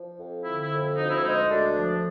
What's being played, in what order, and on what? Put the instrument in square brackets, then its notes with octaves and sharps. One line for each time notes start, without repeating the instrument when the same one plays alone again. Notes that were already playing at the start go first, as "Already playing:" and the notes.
Already playing: [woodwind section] F3
F2
D3 E4
E4
F2
D2 D#4
E4
G#3 D#4
D2 D4
F3